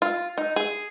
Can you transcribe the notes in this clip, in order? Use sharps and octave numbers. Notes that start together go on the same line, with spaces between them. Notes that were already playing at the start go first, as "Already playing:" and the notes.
F4
D#4
G#4